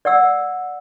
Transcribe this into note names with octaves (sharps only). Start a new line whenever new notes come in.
D5 F#5 E6